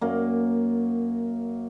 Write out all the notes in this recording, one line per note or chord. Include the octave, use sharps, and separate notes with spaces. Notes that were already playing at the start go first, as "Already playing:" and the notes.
F#2 A#3